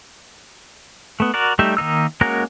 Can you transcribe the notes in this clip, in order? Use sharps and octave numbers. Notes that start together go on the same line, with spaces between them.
A3 B3
F#4 A#4 D5
G3 A3 D#4 G4 E5
D#3 A#3 D#4 E6
G#3 A#3 C#4 F#4 A#4